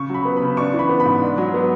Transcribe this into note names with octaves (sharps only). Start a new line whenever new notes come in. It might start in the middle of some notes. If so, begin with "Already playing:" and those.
Already playing: C#3 C#6
F#3 B5
B3
B5
C#3
D4 C#6
E3
B5
B3
B5
G#2
D4
F#3
B3